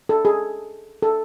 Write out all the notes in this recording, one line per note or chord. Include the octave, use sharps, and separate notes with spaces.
A4
G#4
A4